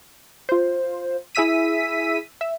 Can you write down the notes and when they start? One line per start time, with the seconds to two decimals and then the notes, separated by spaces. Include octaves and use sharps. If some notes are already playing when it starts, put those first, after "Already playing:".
0.49 F4 C5
1.35 E4 G#4 E5 E6 B6 D#7
2.41 E5